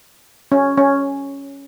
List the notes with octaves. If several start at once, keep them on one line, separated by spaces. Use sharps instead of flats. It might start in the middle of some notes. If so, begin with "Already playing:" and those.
C#4
C#4